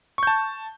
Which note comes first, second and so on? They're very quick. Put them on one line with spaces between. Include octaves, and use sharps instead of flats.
C#6 G6 A5